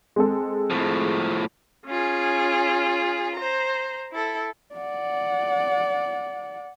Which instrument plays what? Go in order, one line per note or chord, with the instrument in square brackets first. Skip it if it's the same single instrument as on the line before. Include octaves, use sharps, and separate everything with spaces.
[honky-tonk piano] G#3 C4 A4
[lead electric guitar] A2 F3
[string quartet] C#4 F4 G#4
C5 A#5
E4 A4
[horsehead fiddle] D5 F#5